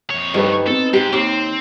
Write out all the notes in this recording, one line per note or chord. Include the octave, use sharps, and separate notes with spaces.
F2 C#5
D2 G2 D#4 G4 B4
B3 C4 D#4 A4
G#2 G4
D#2 C4 D6 C7